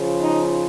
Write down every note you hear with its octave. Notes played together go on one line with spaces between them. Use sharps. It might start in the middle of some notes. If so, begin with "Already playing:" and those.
Already playing: C#3 F3
D#4